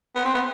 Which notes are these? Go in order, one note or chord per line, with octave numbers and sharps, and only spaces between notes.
B3
C4
B3